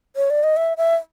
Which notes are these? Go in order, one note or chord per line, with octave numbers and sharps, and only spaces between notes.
C#5
D5
D#5
E5
E5